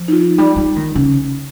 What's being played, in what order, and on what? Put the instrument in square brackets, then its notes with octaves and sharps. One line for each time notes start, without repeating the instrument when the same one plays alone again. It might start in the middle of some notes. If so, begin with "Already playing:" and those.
Already playing: [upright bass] F3
[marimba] D#4
F4
[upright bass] G3 [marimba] D#4
[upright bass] G3
D#3
C#3